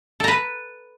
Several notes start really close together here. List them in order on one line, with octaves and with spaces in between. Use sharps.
A4 A#5 B4